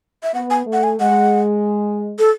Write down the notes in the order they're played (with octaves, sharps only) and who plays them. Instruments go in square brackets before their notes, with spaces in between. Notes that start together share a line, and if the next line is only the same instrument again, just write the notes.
[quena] E5
[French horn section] B3 [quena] F#5
[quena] G#5
[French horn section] A3
[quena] F#5
G#5
[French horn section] G#3 [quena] F#5
[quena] A4